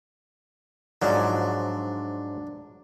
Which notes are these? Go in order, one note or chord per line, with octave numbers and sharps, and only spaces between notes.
G#2 F3 F#3 D4